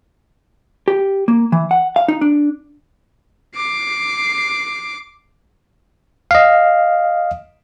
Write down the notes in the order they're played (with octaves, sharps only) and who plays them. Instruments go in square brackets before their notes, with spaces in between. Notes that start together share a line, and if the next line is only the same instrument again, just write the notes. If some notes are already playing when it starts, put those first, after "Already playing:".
[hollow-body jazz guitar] G4
A#3
E3
F#5
F5
D#4
D4
[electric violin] D6 C7
[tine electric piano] D#5 F5